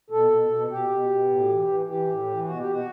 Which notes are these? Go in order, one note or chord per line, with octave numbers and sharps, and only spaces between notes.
B2 A4
B2
B2
B2 G4
B2
B2
A2
E3
E3
E3 G4
A2
E3
B2 F#4
G4
B2
F#4